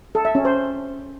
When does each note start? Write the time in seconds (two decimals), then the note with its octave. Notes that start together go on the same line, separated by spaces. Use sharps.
0.15 A4
0.25 E5
0.35 C#4
0.45 C5